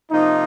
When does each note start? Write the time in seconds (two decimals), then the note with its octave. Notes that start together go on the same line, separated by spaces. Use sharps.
0.11 C3 F3 A#3 D#4 F4